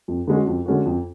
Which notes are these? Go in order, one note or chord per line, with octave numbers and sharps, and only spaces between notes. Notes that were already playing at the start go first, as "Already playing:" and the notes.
F2
D3 G#3 C#4 F#4
F2
D3 G#3 C#4 F#4
F2